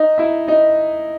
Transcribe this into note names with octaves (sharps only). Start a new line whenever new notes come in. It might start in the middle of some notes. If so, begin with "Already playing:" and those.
Already playing: D#4 D#5
E4 E5
D#4 D#5